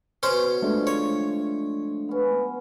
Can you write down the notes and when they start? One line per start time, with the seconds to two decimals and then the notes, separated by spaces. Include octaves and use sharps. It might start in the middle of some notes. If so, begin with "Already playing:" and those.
0.23 B2 C#4 C5
0.62 F3 G#3 A3 D4
0.87 C#5
2.09 B3 C#4